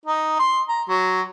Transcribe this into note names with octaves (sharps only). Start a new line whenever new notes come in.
D#4
C6
A#5
F#3